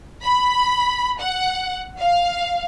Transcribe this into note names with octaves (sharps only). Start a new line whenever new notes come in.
B5
F#5
F5